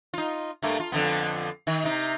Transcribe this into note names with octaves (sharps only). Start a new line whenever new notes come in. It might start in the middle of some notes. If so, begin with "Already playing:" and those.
D#4 F4
G2 A3 A#3
F4
F2 D3 B3
D#3
C3 D#4